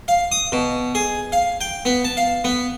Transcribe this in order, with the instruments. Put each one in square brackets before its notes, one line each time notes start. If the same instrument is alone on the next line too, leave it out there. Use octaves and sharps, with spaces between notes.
[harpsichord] F5
D#6
B2
G#4
F5
G5
B3
A5
F5
B3